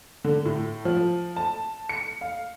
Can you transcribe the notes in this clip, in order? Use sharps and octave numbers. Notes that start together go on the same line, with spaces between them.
D3
A2
F3
A5
C#7
F5